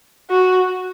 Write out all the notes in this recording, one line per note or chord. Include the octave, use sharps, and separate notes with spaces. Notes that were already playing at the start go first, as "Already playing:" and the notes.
F#4